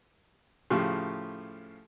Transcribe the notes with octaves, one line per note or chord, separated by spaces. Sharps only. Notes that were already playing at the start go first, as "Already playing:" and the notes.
A2 C#3 F3 G4